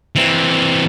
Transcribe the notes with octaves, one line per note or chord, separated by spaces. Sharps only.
E3 C4